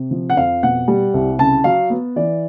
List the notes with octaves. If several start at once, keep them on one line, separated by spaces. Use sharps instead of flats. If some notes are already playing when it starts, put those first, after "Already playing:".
Already playing: C3
F3
F#5
F2 F5
B2 F#5
G3
C2
C#3 A5
F#3 F5
B3
E3 D5